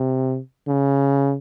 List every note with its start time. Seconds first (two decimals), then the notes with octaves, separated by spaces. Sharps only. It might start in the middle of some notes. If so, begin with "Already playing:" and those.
Already playing: C3
0.68 C#3